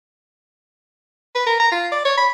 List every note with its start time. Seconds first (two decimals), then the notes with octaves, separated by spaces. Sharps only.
1.35 B4
1.46 A#4
1.60 A#5
1.71 F4
1.92 D5
2.05 C#5
2.17 B5